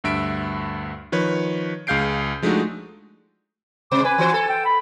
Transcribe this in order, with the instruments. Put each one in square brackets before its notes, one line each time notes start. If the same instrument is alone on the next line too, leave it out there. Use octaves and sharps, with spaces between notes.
[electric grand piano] D2 G2 E5 D7
D#3 F3 B4 C#5
C#2 G#4 F5 G6 C7 D7
F3 G#3 A3 D4 D#4 F#4
[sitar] C3 G#3 C5 [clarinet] D6
[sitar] B4 [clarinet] G#5
[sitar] E3 F#4 C5
A4
[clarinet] G5
B5